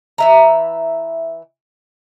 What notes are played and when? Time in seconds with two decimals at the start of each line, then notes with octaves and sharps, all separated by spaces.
0.18 E3 E5 A#5